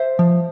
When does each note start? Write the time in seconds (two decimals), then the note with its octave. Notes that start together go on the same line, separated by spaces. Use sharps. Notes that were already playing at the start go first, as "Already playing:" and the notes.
Already playing: C5 E5
0.19 F3